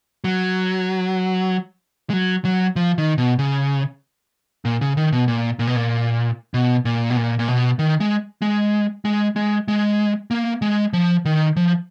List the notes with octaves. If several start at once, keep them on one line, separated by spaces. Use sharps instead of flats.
F#3
G#3
F#3
F#3
F3
D#3
B2
C#3
A#2
C#3
D#3
B2
A#2
A#2
B2
A#2
B2
A#2
B2
A#2
A#2
B2
D#3
G#3
G#3
G#3
G#3
G#3
A#3
G#3
F3
D#3
F3